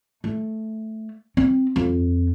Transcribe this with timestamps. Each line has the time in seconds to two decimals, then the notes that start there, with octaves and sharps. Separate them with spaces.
0.24 A3
1.37 C4
1.76 F2